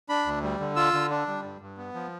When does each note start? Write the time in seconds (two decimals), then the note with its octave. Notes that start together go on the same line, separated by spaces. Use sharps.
0.09 D4 B5
0.26 D2
0.43 G3
0.60 D3
0.76 F4 E6
0.93 D3
1.10 D4
1.27 G3
1.44 G2
1.61 G2
1.77 B3
1.94 F3